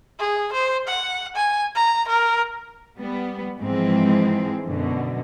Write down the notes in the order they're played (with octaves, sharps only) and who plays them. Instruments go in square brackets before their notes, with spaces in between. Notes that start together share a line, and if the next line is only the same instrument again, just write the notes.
[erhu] G#4
C5
F#5
G#5
A#5
A#4
[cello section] G3 B3
G#2 E3 F3 G#3 C4
F#2 B2 D3